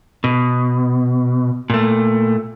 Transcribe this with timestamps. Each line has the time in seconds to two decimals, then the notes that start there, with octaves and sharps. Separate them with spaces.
0.24 B2
1.70 A#2 A3